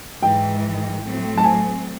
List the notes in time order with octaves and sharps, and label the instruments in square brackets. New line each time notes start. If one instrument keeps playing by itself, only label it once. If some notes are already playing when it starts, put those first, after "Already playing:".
[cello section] G#2 E3 G#3 [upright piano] G5
[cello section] A2 F#3 A3 C4
[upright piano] A5
G#5